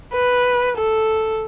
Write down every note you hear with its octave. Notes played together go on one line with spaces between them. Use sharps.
B4
A4